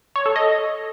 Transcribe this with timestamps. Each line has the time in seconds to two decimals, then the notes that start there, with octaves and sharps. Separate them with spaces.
0.16 C#5
0.26 A4
0.36 D#5